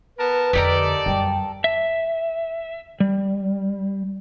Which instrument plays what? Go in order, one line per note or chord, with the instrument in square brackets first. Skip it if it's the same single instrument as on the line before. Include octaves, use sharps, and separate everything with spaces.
[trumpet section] B3 A#4 A5 [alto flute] B4
[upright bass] F2 D3 [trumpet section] D#4 D5 [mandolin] G4 A4 A#4
[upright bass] F#2 G3 [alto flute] G5
[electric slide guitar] E5
G3